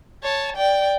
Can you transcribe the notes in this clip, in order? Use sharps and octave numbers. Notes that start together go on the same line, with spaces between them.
C#5 A5
D5 G5